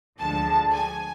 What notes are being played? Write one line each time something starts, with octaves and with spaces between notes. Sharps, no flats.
D2 D3 F3 G#3 A5
G#5